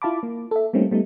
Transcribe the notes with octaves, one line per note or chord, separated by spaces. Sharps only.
E4 F4 F5 A5 B5 D6
A#3
A4 E5
G3 A3 A#3 C4 C#4 D#4
G3 A3 B3 D#4